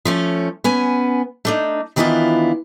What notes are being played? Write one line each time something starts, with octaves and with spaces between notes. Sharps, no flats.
F3 A3 C#4
B3 C#4 G#5
A3 D4 D#4
D#3 E3 B3 D4 E4 F4